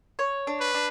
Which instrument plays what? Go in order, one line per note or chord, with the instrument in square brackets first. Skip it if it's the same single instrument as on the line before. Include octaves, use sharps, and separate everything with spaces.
[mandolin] C#5
D4
[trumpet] B4
[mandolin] D4